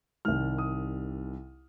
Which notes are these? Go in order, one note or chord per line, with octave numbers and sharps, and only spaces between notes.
C2 C3 D#3 G3 F6
D#6